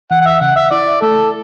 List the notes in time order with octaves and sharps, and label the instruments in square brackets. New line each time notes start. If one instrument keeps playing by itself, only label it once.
[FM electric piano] E3 [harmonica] F#5
[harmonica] F#5
E5
[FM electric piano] C#3 [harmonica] F#5
[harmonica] E5
[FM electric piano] E4 [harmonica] D5
[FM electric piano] A3 [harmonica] A4